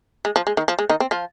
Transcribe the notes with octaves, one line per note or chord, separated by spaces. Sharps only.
G#3
F3
G#3
D#3
F3
G#3
D#3 D#4
C4
F3 F4